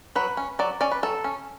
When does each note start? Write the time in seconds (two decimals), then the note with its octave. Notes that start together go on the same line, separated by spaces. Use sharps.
0.15 F#3 B4
0.37 C#4
0.59 F#3 D5
0.81 C#4 D5
0.91 B4
1.03 F#3 A4
1.24 C#4